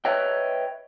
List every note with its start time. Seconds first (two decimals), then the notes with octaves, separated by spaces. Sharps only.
0.05 B4 C#5 D#5 E5 G5